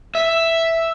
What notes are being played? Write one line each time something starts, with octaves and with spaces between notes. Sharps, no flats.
E5